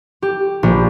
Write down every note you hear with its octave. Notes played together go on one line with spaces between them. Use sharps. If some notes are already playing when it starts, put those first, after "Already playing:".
G4
A#1